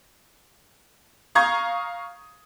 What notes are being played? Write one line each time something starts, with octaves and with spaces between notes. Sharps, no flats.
F5 A#5 C#6 D#6 G6 G#6